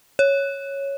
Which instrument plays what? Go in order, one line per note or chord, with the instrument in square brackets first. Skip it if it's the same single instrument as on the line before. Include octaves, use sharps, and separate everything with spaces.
[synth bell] C#5